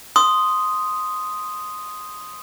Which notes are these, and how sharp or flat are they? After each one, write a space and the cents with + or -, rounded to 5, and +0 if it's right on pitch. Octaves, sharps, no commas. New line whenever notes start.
C6 +0 D#6 +0